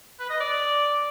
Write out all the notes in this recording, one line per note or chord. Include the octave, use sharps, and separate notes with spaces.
B4
D#5
D5